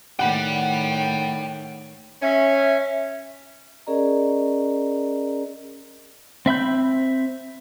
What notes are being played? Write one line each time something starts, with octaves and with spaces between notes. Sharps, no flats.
A2 D#3 F#5 G5 B5
C#4 E5
C#4 G#4 A#4 D5 D#5 A#5
C4 E5 B5 G6